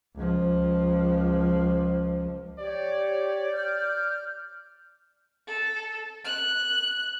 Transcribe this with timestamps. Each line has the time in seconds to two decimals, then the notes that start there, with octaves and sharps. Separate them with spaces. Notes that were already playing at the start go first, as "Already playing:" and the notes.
0.15 C#2 F3
2.59 G4 C#5 D5
3.52 F6 G6
5.47 A4
6.24 F#6